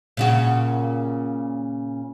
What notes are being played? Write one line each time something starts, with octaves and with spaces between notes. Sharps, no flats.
A#2 C#3 F#4